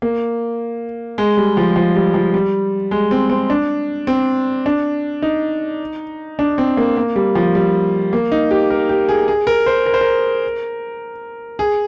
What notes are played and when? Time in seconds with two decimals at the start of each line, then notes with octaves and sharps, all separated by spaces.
0.02 A#3
1.18 G#3
1.37 G3
1.57 F3
1.76 F3
1.95 G3
2.14 F3
2.34 G3
2.91 G#3
3.11 C4
3.30 C4
3.50 D4
4.07 C4
4.66 D4
5.22 D#4
6.39 D4
6.58 C4
6.77 A#3
6.97 A#3
7.16 G3
7.35 F3
7.55 G3
8.13 A#3
8.32 D#4
8.51 G4
8.70 A#4
8.89 G4
9.09 G#4
9.28 G#4
9.47 A#4
9.66 C5
9.86 A#4
9.94 C5
10.01 A#4
11.59 G#4